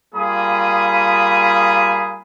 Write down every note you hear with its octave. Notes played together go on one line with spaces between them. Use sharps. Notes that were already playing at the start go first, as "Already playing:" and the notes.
G3 A#3 F4 G#4 B5 D#6